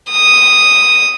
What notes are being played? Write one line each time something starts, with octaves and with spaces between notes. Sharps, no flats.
D#6